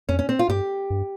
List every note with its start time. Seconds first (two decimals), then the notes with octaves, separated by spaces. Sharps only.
0.09 F2 C#4
0.19 C#4
0.29 C4
0.39 F4
0.49 G2 G4
0.90 G2